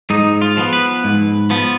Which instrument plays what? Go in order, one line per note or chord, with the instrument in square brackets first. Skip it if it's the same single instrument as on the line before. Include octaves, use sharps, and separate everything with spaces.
[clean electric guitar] G#2 D#4
F4
F3 B3
B4
G#2
F3 B3